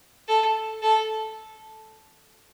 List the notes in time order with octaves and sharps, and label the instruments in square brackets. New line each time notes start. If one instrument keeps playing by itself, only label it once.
[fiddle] A4
A4